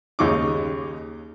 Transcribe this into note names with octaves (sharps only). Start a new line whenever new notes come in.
D#2 C#3 D#4 C#6 D6